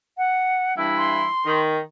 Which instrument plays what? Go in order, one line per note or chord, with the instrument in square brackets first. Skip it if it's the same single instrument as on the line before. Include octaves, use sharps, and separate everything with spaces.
[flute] F#5
[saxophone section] G2 E3 E4
[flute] C6
[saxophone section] D#3